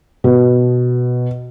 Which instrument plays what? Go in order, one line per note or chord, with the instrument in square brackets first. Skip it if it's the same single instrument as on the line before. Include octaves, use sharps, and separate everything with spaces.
[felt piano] B2